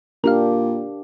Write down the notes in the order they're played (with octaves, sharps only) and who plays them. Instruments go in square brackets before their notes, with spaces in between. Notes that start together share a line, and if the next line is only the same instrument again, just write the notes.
[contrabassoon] A#2 [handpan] D4 G4 [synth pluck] A#4 F5